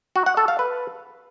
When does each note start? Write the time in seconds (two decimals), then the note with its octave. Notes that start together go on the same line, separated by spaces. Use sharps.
0.16 F#4
0.26 F#5
0.37 A4
0.48 F5
0.59 B4